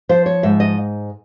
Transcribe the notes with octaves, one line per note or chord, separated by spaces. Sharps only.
F3 C5
C#5
G#2 E5
D#5